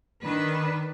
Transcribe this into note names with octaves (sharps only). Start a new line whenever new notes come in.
D#3 D4 B4